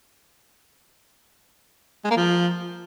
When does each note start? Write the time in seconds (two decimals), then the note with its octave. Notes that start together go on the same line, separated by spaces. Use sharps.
2.05 G#3
2.11 A#3
2.17 F3